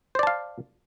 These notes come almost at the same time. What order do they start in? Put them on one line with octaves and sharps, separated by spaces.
C5 D5 A5 F5